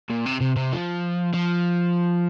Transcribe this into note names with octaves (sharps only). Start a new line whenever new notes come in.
A#2
C3
C3
C3
F3
F3